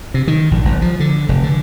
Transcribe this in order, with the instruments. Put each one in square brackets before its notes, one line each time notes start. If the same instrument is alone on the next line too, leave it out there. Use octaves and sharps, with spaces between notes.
[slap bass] C3
D#3
A#1
G1
F3
D3
F1
D3